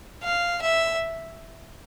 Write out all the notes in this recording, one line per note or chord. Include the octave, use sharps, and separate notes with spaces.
F5
E5